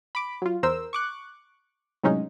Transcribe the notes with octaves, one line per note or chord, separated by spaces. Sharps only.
B5 D6
F#3 F4
E2 A#4 C5 E6
C#6 D6 F#6
A2 C3 F#3 G#3 C#4 D#4